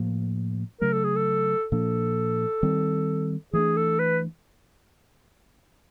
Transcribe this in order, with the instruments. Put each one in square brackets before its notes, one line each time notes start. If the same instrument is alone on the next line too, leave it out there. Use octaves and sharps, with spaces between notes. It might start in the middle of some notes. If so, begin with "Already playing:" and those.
Already playing: [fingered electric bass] A2 F3 A#3
[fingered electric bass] C#3 F#3 A3 [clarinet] A#4
[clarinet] A4
G#4
A4
[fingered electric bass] A#2 F3 A#3 D4 [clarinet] A4
[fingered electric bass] D#3 G3 C4
[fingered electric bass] E3 A3 D4 [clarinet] G#4
[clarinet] A4
B4